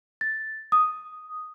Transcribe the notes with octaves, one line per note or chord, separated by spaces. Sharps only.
A6
D#6